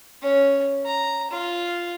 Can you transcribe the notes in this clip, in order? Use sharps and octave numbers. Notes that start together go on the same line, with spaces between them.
C#4
A#5
F4